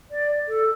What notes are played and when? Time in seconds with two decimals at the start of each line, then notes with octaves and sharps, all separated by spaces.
0.11 D5
0.48 A4